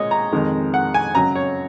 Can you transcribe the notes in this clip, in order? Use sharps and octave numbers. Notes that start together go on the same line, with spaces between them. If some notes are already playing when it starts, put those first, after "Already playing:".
Already playing: A#2 G#3 C#5 D#5
A#5
F2 D#3 G#3
F#5
G#5
F#2 C#3 F#3 A#5
C#5